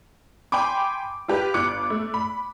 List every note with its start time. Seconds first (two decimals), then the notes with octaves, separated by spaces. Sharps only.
0.52 G5 G#5 B5 C6 D6
1.28 F4 G4 B4
1.54 G1 F4 D6 F#6 C#7
1.90 A3
2.14 B5